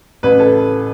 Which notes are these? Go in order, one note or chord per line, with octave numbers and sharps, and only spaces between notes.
A1 B4
A4